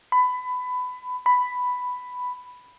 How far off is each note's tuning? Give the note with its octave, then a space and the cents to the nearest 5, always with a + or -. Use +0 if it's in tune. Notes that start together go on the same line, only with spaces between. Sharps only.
B5 +20
B5 +5